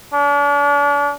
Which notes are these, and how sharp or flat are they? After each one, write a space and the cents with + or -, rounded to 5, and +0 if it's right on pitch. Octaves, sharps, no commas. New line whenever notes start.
D4 -40